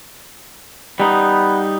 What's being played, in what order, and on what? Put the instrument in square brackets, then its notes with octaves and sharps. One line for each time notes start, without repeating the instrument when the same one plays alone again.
[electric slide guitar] G3 D#4 [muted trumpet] B3